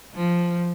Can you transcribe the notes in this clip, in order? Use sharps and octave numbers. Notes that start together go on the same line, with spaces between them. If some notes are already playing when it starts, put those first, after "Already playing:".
F3